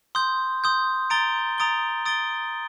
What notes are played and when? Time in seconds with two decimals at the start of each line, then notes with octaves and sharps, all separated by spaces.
0.15 C6 D#6 G6
0.64 C6 D#6 G6
1.10 A#5 D#6 A6 D7 G7
1.58 A#5 D#6 A6 D7 G7
2.06 D#6 A6 D7 G7